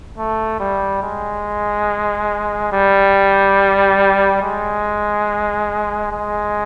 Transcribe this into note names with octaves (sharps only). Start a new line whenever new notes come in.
A3
G3
G#3
G3
G#3
G#3